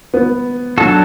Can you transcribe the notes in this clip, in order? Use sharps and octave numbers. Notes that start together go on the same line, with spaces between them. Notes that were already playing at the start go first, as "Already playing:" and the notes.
B3
F#3 D4 F#4 A4